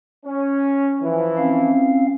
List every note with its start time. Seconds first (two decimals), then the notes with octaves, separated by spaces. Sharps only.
0.25 C#4
1.02 E3 F3
1.38 C4 C#4 F5